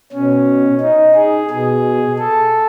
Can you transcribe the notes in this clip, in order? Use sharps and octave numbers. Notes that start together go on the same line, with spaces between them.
B2 C#4
D#4
G#4
B2 G#4
A4